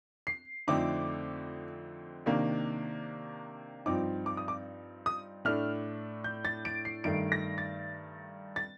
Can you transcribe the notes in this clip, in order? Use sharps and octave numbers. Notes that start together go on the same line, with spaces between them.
C7
F2 D3 A3 C4 D#4 D6
C3 D#3 A#3 D4
G2 F3 C4 D#4 D6
D6
D#6
D6
D#6
A2 A3 D4 F6
G6
A6
D7
C7
G2 D#3 A3 D7
A#6
A6
A6